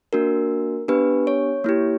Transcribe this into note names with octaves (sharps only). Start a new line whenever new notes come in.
A#3 D4 F#4 A#4
B3 D4 G4 B4
C#5
A#3 E4 G4